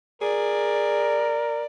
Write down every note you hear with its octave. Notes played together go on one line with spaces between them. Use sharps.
G#4 A#4 D5